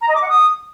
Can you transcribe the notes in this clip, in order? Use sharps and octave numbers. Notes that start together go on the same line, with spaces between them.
A#5
D#5
D6
F#5
D#6